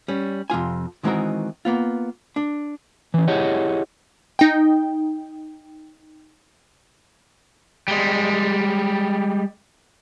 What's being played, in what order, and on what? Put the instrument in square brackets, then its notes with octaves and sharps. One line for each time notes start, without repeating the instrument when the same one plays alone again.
[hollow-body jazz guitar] G3 C#4
F2 C3 F4 G#5
D#3 E3 G#3 C4 F#4 A#4
A#3 B3 F4
D4
[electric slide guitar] E3 C#4
E4 G4 G#4 C#5 D#5 F#5
[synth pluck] D#4 G5
[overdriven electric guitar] G3 G#3